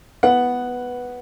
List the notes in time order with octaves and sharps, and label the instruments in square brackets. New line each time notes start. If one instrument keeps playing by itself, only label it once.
[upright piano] B3 F#5